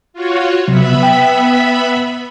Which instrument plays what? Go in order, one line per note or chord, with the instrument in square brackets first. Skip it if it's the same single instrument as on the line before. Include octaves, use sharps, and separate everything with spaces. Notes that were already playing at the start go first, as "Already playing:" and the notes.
[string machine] F4 F#4 C#5
[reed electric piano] C3 F#3 [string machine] B3 E5 B5
[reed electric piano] G5